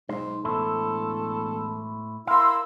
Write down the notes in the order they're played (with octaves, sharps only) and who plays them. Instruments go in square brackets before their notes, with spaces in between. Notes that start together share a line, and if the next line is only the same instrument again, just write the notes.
[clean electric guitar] B1 C5 [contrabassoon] G#2
[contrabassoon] E1 [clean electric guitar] A2 E4 C5 [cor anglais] A4
[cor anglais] E4 [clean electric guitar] A#4 F5 [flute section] C6 E6